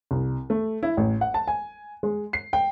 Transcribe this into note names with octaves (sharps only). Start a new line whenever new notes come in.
C2
A3
E4
A1
F#5
A5
G#5
G#3
C7
G5